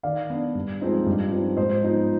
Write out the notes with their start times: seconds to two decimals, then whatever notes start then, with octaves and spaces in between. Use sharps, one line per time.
0.03 D#3 D5 F5
0.30 B3 D4
0.55 G2
0.81 F3 G#3 C4 D#4
1.06 G2
1.31 F3 C4 D#4
1.57 G#2 C5 D#5
1.83 F3 B3 D#4